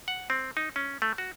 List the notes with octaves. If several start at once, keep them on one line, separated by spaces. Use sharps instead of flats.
F#5
C4
D#4
C#4
A3
F#4